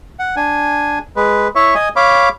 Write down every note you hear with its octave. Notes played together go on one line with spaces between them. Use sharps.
F#5
D4 G#5
G#3 B4
E4 C#5 E5 C#6
D#5 G#5
C#5 F5 B5 D6